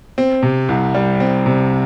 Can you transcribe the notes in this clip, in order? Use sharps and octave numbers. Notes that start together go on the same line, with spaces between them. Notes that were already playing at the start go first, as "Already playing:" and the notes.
C4
C3
C2
G3
C4
C3